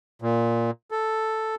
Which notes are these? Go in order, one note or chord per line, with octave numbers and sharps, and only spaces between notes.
A#2
A4